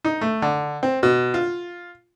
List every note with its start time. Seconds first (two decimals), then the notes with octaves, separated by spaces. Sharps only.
0.05 D#4
0.21 A3
0.42 D3
0.83 C4
1.03 B2
1.34 F4